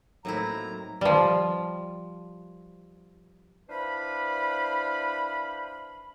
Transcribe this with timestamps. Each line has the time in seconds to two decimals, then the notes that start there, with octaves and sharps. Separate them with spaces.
0.25 A2 F#3 A#3 C4 D#4 E4 A#5
1.01 F3 G3
3.69 D4 E4 B4 C5 F5 B5